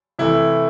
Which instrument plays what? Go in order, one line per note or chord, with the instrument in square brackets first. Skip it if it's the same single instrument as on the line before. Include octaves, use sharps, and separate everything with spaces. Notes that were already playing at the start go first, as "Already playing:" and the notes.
[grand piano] C3 E3 A3 E4